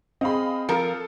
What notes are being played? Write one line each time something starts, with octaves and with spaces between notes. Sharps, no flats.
C4 G#4 D#5 F5 B5
F3 F4 A4 A#4